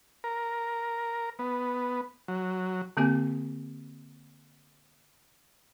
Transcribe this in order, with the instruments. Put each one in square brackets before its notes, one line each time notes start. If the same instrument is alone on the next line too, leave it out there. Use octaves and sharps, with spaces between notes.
[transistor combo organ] A#4
B3
F#3
[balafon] D3 A#3 C4 G4 G#5